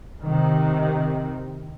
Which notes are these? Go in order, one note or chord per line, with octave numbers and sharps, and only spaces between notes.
C3 D#3